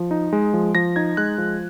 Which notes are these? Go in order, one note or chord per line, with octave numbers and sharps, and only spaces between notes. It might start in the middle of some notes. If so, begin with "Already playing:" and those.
Already playing: F3
D#4
G#3
F3
F3 A#6
D#4 G#6
G#3 F#6
F3